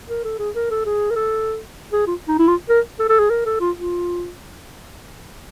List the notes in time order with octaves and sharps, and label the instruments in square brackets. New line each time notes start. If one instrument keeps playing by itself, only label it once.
[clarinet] A#4
A4
G#4
A#4
A4
G#4
A#4
A4
G#4
F4
D#4
E4
F4
A#4
A4
A4
G#4
A#4
A4
F4
F4